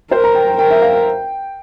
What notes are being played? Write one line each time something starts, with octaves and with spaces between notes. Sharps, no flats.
A#4 C5
A#5
G5
G5
A#4 G5
E5
F5
G5